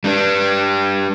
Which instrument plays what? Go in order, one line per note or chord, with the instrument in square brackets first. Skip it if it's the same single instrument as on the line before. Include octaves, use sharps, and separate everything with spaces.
[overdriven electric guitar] G3 D4